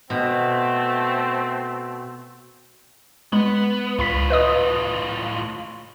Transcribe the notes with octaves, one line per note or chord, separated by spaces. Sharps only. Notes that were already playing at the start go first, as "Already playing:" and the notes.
B2 A3 C4
G#3 B3
C#2 A2 F4 B5 B6
B4 D#5 D#6